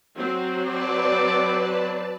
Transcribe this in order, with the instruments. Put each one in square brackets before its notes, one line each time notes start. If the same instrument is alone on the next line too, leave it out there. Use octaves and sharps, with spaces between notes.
[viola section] F#3 C4
[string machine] B4 D5 A5 [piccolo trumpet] D6